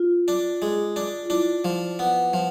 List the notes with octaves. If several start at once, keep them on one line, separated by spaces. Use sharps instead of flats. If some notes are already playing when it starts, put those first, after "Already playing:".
Already playing: F4
D4
G#3
D4
F4
D4 E4
F3
B3
F3